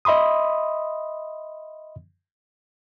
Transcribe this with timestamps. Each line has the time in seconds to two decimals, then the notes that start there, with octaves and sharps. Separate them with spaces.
0.05 D#5 E5 B5 C6 D#6